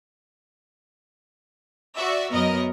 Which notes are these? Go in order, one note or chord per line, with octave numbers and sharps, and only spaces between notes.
F#4 D5 E5
F#2 B3 A#4 D#5